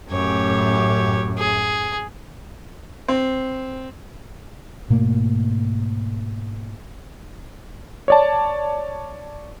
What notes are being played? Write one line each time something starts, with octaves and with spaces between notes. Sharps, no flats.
F#2 A2 G4 C#5
G#4
C4
G#2 B2 A3 A#3
C#5 D5 A5